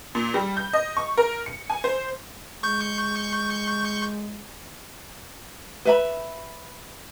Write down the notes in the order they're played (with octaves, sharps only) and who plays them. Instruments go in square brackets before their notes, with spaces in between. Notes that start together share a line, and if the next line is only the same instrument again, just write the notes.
[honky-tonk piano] A#2
G3
G6
D#5
C#6
A#4
C#7
G#5
C5
[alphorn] G#3 [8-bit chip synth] C#6 G6
[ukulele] B4 E5 B5